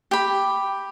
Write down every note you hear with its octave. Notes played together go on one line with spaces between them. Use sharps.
G4 B5